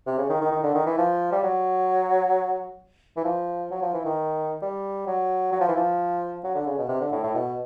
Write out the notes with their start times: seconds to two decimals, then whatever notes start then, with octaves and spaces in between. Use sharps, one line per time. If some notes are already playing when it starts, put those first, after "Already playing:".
0.07 C3
0.18 C#3
0.30 D#3
0.41 D#3
0.52 D#3
0.64 D3
0.75 D#3
0.86 E3
0.98 F3
1.32 G3
1.43 F#3
3.17 E3
3.25 F3
3.71 F#3
3.82 F3
3.94 E3
4.05 D#3
4.62 G3
5.07 F#3
5.53 F#3
5.61 F3
5.68 E3
5.77 F3
6.44 F#3
6.55 D3
6.67 C#3
6.78 B2
6.89 C3
7.01 D3
7.12 A2
7.24 A2
7.35 B2